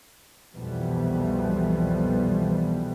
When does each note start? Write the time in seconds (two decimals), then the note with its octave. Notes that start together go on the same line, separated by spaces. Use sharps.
0.55 C2 F2 B2 E3 G3 B3